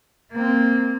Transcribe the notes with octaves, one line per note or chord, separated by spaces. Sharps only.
A#3 C4